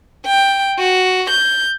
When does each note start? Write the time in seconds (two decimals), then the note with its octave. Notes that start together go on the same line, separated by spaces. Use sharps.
0.26 G5
0.79 F#4
1.30 G6